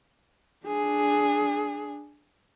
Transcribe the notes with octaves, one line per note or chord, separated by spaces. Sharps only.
D4 G#4